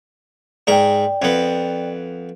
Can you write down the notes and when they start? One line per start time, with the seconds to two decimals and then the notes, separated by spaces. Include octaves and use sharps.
0.67 G#2 A#4 D5 G5
1.22 F2 B3